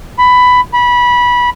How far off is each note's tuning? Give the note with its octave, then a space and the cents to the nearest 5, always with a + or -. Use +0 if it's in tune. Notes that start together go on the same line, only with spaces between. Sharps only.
B5 +10
B5 -20